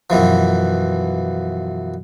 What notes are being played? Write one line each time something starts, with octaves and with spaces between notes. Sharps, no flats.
F#2 B2 E3 F3